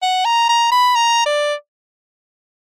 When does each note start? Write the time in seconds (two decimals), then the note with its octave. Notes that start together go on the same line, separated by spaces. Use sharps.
0.02 F#5
0.25 A#5
0.49 A#5
0.71 B5
0.96 A#5
1.26 D5